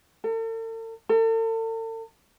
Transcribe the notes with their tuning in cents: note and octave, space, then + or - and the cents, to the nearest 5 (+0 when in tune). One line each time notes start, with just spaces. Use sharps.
A4 +45
A4 +40